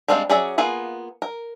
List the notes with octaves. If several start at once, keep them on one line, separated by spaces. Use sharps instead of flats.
G3 G#3 C4 D4 F5
F#3 C#4 G#4 D5 E5
A#3 B3 F4 G#4 F#5
A#4